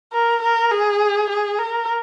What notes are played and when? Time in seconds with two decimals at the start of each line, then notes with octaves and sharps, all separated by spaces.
0.13 A#4
0.42 A#4
0.71 G#4
1.30 G#4
1.59 A#4